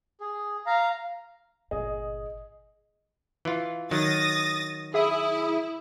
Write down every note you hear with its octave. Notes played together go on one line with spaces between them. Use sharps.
G#4
F5 A#5
G1 A#2 G#4 D#5
E3 F4
D#3 F#3 D#6 A6 A#6
E4 G#4 E5 D#6